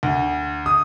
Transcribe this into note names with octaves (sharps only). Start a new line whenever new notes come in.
D2
D#6